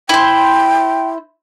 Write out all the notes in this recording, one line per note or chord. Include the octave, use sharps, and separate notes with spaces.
E4 C5 G5